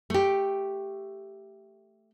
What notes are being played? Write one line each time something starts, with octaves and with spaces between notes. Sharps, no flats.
A3 G4